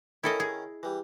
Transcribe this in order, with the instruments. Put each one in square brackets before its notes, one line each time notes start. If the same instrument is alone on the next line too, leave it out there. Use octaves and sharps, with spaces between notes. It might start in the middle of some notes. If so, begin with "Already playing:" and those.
[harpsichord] D#3 C#4 A#4 [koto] E4 A4 D#5
[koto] G#4
[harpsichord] E3 G3